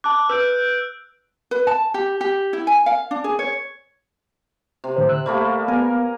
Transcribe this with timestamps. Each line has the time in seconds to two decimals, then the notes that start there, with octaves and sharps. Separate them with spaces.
0.04 A5 D6 F#6
0.30 B4 E6 G6 D7
1.51 B4
1.67 A5
1.94 G4
2.21 G4
2.53 E4
2.67 G#5
2.86 F5
3.11 D4
3.24 G#4
3.39 C#5
4.84 C3
4.96 A2 D3 C5
5.09 E6 F#6
5.26 G3 A3 A#3
5.68 B3 A#4 G#5